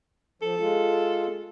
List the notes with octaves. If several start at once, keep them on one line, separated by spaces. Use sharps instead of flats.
F3 A4
G#3 F4